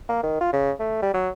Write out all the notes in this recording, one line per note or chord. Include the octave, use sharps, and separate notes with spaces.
A#3
D#3
F4
C#3
A3
G3
F#3